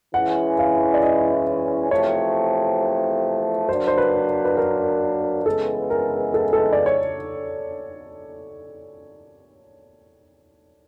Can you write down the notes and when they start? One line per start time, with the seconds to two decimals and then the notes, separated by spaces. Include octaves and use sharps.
0.14 E3 G#3 C#4 E4 F#5
0.59 F5
0.94 D5
1.02 D#5
1.91 E2 C3 F3 A3 C#5
3.68 F#3 A#3 D4 C5
3.87 C5
3.98 B4
4.45 B4
4.57 A#4
5.46 C#3 E3 G#3 B3 A4
5.90 A#4
6.34 A4
6.53 A4
6.73 D5
6.86 C#5